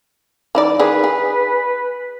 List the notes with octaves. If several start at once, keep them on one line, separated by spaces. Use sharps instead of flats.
E3 D#4 D5
D#3 G#4 B4 D5
G#4